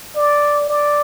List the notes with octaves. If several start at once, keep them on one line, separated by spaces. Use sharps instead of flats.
D5
D5